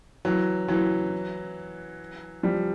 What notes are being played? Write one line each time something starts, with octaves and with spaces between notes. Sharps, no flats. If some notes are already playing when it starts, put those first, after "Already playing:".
E3 F#3
E3 F#3
F3 G3